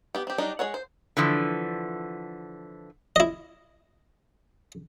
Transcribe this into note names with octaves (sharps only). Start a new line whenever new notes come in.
B3 G4
C4 G4
F#3 G3 D4 D#4
G#3 G#4 C#5 F#5
C5
D3 E3 F3
E4 D#5